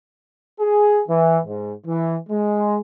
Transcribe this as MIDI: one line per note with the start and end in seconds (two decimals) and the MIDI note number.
0.60 1.02 68
1.09 1.39 52
1.46 1.72 44
1.87 2.17 52
2.29 2.79 56